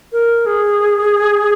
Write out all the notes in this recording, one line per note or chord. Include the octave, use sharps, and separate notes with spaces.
A#4
G#4